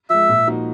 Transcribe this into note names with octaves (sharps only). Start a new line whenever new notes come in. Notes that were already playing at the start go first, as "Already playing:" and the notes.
F3 G#3 E5
A#2
F3 A#3 D#4 F#4